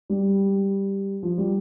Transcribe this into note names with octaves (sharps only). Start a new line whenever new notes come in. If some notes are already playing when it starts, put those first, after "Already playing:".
G3
F3
G3